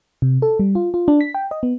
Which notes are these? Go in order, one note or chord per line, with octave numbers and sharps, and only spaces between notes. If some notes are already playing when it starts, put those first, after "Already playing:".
C3
A4
G3
F4
F4
D4
B6
G5
D#5
B3